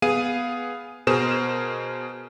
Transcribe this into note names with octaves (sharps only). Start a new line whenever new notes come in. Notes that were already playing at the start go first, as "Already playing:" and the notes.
B3 G#4 F5 D#7
B2 G#4 A#4 C5 E7